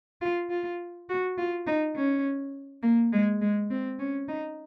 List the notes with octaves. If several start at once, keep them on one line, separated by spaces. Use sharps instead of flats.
F4
F4
F#4
F4
D#4
C#4
A#3
G#3
G#3
C4
C#4
D#4